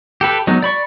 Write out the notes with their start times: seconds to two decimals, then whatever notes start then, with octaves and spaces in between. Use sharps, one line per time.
0.21 G4 A4 B4
0.47 F#3 G#3 B3 D#4
0.62 D5 B5 C#6